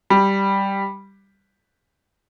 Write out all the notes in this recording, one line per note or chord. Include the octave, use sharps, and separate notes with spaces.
G3